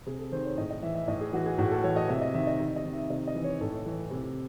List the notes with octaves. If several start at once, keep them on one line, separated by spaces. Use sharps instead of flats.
C3 G#4
A4
D#3 C5
C#5
A2 D#5
D#5
E3 E5
E5
A2 D#5
G#4
E3 F#4
G#4
A2 F#4
A4
E3 C#5
D#5
C3 E5
D#5
D#3 E5
D#5
C3
D#5
D#3
E5
C3 D#5
D#5
E3
C#5
A2 A4
E3
C3